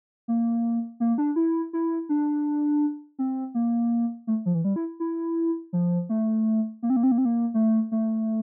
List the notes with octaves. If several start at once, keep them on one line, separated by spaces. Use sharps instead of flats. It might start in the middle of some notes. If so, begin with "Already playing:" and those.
A#3
A#3
D4
E4
E4
D4
C4
A#3
A3
F3
E3
G3
E4
E4
F3
A3
A#3
C4
A#3
C4
A#3
C4
A#3
A3
A3